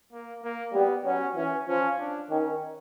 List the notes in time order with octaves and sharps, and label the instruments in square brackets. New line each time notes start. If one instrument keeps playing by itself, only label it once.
[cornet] A#3
A#3
[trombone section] G3 [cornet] B3
[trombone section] F#3 [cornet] C#4
[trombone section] E3 [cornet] C#4
[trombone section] F3 [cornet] C#4
[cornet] D4
[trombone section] D#3 [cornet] C#4